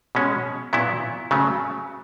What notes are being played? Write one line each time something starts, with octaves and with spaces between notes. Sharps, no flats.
B2 G#3 C#4
A#2 F#3 B3 E4
C#3 F#3 A3